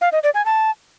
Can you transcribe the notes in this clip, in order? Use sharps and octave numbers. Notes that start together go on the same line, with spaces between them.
F5
D#5
D5
G#5
A5